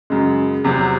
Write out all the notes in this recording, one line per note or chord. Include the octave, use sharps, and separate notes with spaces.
F#2 C#3 G#3
E2 C3 F#3 C4